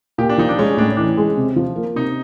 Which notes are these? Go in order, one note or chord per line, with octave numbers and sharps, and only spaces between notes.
A#2 G4
D4
F3 D#4
D4
G#3 C#4
A2 D4
C#4
E3 D4
G#3
C3
F3
A#3
C3 D#4